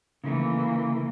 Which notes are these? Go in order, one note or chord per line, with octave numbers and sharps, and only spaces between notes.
C#3 E3 A3 A#3